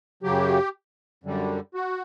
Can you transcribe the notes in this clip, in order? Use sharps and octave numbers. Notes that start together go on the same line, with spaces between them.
F#2 C#3 F#3 G4
F#2 D3 G3
F#4